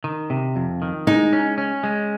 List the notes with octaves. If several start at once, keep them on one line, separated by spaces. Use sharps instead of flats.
D#3
C3
F2
D#3
G#3 D#4
C#4
C#4
G#3